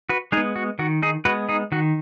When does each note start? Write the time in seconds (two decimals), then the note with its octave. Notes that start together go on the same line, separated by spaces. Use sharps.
0.09 F#4 B4
0.32 G#3 D#4 G#4
0.37 B3
0.56 F#4
0.79 D#3 F#4
1.02 D#4 G#4
1.25 G#3 B3 F#4 B4
1.49 D#4 G#4
1.72 D#3 F#4